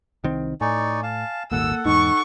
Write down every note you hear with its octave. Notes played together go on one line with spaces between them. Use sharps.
C2 D#3 C4
A2 D#4 D5 G#5 C#6
F5 A5
D#1 G#1 A#3 A4 F#5 E6
E2 G#2 D#4 C#6